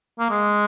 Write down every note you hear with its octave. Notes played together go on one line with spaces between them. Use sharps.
A#3
G#3